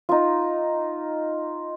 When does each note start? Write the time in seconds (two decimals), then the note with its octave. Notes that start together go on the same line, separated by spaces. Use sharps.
0.09 D#4 F4